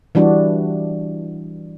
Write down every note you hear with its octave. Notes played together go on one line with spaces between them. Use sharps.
E3 G3 D4 F#4